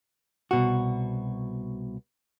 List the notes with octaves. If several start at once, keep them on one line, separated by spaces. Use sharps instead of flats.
C2 B2 F#4